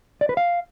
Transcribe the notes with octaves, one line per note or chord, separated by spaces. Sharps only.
D5
B4
F5